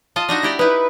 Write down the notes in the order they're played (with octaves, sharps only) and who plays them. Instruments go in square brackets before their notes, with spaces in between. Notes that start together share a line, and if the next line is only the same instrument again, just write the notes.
[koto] F4 D#5 [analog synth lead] A5
[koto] D4 D#4 F#4 [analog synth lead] A#6
[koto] E4 G4 D5
[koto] D#4 E4 [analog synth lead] B4